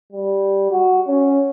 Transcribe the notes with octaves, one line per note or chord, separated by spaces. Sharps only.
G3
F#4
C#4